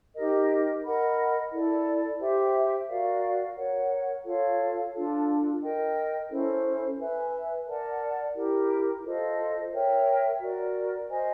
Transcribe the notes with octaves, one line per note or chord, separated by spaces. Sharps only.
D#4 G4 A#4 D#5
A#4 D#5 F#5 B5
E4 A4 D5
G4 C5 E5 G5
F#4 A#4 D5 F5
A#4 C#5 F#5
F4 A4 C#5 F5
D4 F4 A4
A#4 D#5 G5
C#4 E4 A4 C5
B4 E5 G#5
A#4 D5 F#5 A5
E4 G4 A#4
F4 A4 C5 D#5
A#4 C#5 E5 G5
F#4 A#4 D5
C5 D#5 G#5